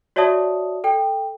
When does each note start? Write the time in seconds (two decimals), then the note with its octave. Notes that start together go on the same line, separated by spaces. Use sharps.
0.16 F#4 C#5 D5 E5 A5 D#6
0.84 A4 G5